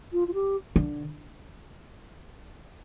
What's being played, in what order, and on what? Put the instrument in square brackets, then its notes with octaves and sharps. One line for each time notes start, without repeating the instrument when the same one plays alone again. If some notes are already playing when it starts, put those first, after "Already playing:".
[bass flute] F4
F4
G4
[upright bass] D3